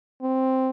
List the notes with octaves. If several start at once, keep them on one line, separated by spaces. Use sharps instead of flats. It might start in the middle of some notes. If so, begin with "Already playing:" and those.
C4